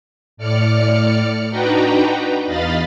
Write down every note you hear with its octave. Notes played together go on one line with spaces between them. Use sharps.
A2 D5 F6 C#7
D4 D#4 F#4 B4 G5 A#5
E2 D#5 F5 B5 A6